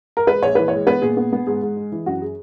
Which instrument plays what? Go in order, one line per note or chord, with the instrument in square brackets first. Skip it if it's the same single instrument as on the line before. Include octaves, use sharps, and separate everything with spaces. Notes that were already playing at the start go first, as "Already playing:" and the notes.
[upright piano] A#4
G#3 B4
A#1 C#5
E3 B4
G#3 C#5
B3 B4
A#2 G#4
B3
B3
G#2 G#4
G#2
G#3
E3
F#2 F#4
G#4